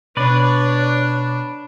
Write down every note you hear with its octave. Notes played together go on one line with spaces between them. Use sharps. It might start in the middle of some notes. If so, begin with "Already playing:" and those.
B2 D4 B4 C#5 D5